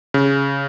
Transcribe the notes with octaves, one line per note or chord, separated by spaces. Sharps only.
C#3